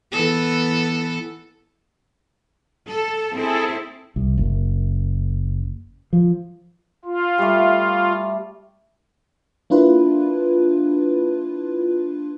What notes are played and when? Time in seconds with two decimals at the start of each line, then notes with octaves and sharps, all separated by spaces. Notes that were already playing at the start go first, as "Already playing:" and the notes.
0.12 E3 B3 A4
2.88 A4
3.35 C4 E4 G#4 A4
4.16 C2
4.38 F#1
6.13 F3
7.05 F4
7.38 G3 A3
9.70 A#3 D4 E4 F4 B4